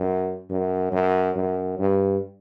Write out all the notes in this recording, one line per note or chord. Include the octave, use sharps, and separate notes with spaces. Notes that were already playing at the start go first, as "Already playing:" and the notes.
Already playing: F#2
F#2
F#2
F#2
G2